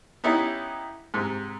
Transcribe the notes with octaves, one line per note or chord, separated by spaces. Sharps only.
B3 C#4 D#4 E4 G4
G#2 C3